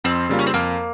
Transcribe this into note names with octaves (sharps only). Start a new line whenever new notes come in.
F2 C4
C#3 G3 A#3 F4
C#4
C4
F2 A#3